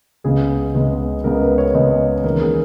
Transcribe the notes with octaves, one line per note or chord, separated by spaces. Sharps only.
C#2 C#3 G#3 B3 G#4
C#2 C#3 G#3 B3
C#2 C#3 G#3 B3 A#4
B4
C#5
C#2 C#3 G#3 B3 D#5
E2 D#3 A#3 C#4 A#4
G#4